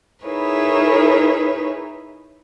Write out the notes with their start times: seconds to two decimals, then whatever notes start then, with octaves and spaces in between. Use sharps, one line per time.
0.25 D#4 E4 G#4 A#4 B4 C#5